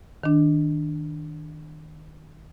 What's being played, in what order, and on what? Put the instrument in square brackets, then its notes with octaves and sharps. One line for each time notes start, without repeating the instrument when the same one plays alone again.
[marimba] D#3 D4